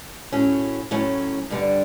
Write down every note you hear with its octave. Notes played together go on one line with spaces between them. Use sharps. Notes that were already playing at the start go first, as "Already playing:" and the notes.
A2 F#3 C#4
A2 F#3 C#4
G2 D3 G3